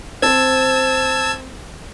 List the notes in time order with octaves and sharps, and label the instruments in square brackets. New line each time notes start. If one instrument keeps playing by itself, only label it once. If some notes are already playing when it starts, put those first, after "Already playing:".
[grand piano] C4 C5 [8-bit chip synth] A5 E6 G#6